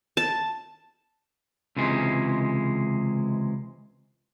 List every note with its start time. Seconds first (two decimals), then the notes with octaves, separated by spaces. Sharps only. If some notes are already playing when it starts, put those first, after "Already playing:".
0.17 A5
1.77 C#2 C3 E3 G#3